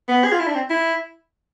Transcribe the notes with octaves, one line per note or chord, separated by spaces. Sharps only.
B3
G#4
F4
E4
D4
C4
E4